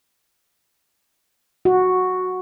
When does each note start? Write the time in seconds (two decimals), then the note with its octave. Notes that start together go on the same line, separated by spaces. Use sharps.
1.65 F#4